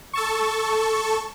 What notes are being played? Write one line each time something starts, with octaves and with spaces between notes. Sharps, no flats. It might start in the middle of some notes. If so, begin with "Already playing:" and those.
A4 A5 C#6